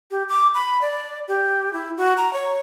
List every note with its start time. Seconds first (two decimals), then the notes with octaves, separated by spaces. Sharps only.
0.11 G4
0.29 D6
0.54 B5
0.81 D5
1.28 G4
1.73 E4
1.97 F#4
2.17 A#5
2.33 C#5